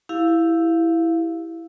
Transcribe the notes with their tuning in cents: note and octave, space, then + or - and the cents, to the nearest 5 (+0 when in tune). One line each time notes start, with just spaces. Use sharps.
E4 +0 G4 +0 F5 +0